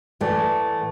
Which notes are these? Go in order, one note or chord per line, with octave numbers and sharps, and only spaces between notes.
A2 E3 A3 D5